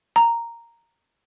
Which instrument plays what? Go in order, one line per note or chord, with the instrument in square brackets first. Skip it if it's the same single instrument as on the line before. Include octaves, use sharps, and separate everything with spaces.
[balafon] A#5